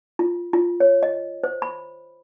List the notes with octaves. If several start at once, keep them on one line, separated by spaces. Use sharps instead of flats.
F4
F4
C#5
D#5
C5
B5